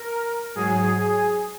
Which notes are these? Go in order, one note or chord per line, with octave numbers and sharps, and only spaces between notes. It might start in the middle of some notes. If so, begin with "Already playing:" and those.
Already playing: A#4
G#2 F#3 G#4